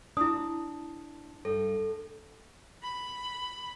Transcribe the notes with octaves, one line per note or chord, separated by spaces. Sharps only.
D4 E4 D#6
G2 A4
B5